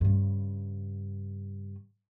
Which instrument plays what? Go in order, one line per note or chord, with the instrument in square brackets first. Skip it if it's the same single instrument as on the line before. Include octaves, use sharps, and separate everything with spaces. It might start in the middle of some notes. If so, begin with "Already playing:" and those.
[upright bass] G2 C#3